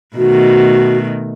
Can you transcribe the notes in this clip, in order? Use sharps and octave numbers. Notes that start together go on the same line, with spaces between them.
B2 D#3 A3 F#4